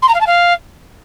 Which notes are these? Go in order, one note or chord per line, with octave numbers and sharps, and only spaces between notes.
C6
A#5
F5
A5
F5